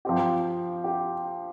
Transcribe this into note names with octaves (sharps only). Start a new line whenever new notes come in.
F3 C4 G4
G4